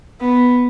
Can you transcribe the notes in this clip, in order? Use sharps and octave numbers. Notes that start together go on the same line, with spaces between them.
B3